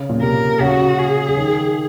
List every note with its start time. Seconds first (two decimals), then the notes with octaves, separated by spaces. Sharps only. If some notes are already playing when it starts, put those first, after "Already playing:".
Already playing: C#3
0.09 A#2
0.22 C3 A#4
0.61 C#3 F#4
0.99 G#4
1.28 C#3
1.37 D#3